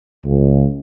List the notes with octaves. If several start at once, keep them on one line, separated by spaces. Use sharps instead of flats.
C#2